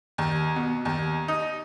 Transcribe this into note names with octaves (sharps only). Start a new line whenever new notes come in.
D#2
B2
D#2
D#4